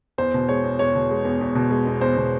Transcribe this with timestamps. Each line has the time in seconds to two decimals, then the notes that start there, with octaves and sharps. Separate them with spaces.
0.18 E2 C5
0.34 B2
0.49 G#3 C#5
0.64 E2
0.79 E2 C#5
0.95 B2
1.11 G#3
1.25 E2
1.41 E2
1.55 B2
1.71 G#3
1.87 E2
2.01 E2 C5
2.17 B2